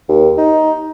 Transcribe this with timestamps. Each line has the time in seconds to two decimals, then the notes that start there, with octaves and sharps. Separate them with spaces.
0.09 D#2
0.38 D#4